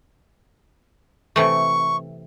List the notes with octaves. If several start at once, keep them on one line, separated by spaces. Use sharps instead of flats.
C3 E3 A3 C#6